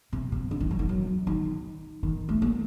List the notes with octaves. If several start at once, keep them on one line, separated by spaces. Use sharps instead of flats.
C3
C3
D3
D#3
F#3
D#3
F#3
D#3
D#3
A3
A#3